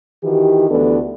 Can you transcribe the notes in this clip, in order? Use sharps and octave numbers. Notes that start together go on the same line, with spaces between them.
D#3 E3 F#4 G4
D2 E3 B3 D4 A4 B4